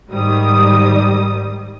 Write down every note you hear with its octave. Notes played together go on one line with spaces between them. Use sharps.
G#2 D#3 G3 D#6